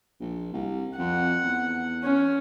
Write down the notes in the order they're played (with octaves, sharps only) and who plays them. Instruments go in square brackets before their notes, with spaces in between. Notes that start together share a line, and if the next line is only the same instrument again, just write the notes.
[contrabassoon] A#1
C2
[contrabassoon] F2 [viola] F#5
[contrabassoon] E2
[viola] C#4